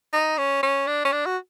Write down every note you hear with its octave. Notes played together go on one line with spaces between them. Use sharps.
D#4
C#4
C#4
D4
C#4
D4
F#4